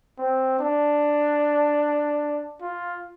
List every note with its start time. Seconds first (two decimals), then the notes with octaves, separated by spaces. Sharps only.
0.19 C4
0.60 D4
2.62 F4